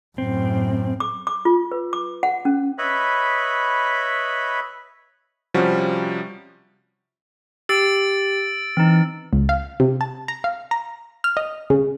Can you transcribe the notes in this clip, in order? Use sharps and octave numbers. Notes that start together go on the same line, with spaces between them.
F#2 A2 C4
D6
D6
F4
B4
D6
F#5
C#4
B4 C#5 D#5 E5 B5
C3 F3 G3 C#4 F#4
G4 E6 A6 D7
E3 C4 D#4
C#2
F5
C3
A5
A#5
F5
A#5
F6
D#5
C#3